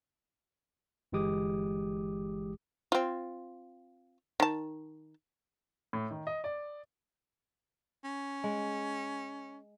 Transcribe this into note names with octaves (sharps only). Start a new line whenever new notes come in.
G1 E3 G#3 G4 D6 D#6
C4 F4
D#3 A5
A2
D#3
D#5
D5
C#4
G#3